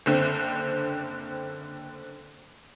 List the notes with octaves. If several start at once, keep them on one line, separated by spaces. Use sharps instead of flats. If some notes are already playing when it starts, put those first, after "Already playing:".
F#1 D3 C4